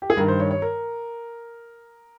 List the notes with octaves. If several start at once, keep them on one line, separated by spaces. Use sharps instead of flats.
G4
G#4
G2 D#3 A#4
C5
C#5
C#5
A#4